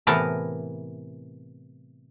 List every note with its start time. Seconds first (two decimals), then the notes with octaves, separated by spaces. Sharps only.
0.07 A2 C3 E3 B3 A#4 A5